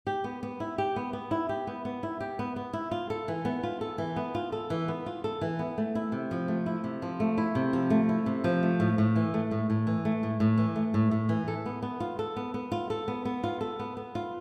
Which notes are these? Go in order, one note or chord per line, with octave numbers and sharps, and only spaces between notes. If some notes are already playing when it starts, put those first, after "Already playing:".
G4
B3
B3
E4
G4
B3
B3
E4
G4
B3
B3
E4
G4
B3
B3
E4
F4
A4
E3
B3
F4
A4
E3
B3
F4
A4
E3
B3
F4
A4
E3
B3
A3
E4
C3
F3
A3
E4
C3
F3
A3
E4
C3
F3
A3
E4
C3
F3
A3
A2
A2
E3
A3
A2
A2
E3
A3
A2
A2
E3
A3
A2
A2
E3
A4
B3
B3
F4
A4
B3
B3
F4
A4
B3
B3
F4
A4
B3
B3
F4